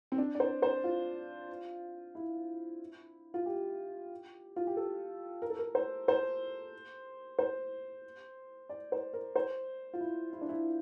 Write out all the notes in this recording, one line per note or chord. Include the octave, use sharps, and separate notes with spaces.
C4
D4
D5
C5
C5
F4
E4
F4
G4
F4
G4
A4
A#4
A4
A#4
C5
C5
C5
D5
C5
A#4
C5
F4
E4
E4
D4
E4